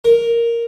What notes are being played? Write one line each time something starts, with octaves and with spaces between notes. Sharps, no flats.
A#4